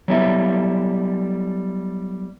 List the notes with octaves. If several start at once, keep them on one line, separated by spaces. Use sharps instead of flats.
F#3 G3 B3 E4 A4 E5